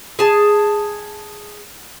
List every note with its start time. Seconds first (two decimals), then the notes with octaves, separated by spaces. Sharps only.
0.19 G#4 A5